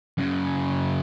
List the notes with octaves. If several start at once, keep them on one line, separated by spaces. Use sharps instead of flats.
F#2 C#3